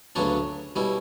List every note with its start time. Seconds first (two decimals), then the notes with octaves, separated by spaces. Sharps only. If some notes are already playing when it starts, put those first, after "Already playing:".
0.15 D2 C#3 F#3 B3 D4 C#5
0.76 B2 G3 C#4 E4